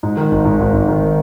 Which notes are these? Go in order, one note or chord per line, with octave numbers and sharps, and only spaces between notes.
G#2
D#3
G#1
G#2
G#1
G#1
D#3